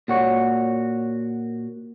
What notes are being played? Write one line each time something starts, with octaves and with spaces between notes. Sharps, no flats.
A#2 F#4 C#5